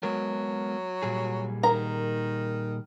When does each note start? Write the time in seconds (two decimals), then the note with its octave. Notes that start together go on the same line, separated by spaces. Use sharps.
0.03 F#3 G#3 B3 A#4
1.03 A#2 G3 G#4
1.63 D#3 A#4 A#5